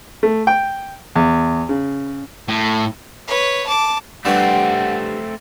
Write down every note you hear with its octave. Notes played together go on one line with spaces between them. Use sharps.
A3
G5
E2
C#3
A2
B4 C#5
A5 D6
G2 G3 A3 C4 F#5